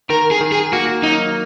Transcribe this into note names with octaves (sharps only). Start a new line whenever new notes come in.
D#3 A#4
G#4
D#3
G#4
A#3 F#4
F#3 D#4